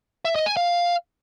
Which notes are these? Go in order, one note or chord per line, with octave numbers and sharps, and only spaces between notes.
E5
D#5
G#5
F5